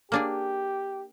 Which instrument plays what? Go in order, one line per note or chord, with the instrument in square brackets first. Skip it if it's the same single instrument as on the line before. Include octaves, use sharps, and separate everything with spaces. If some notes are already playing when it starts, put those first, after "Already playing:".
[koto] A#3 D4 G#4 [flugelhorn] G4